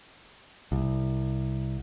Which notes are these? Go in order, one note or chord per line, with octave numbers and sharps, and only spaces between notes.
C2